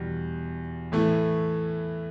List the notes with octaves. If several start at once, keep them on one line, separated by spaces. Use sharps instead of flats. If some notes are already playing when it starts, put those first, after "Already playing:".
Already playing: E2 B2 G3
A2 E3 A3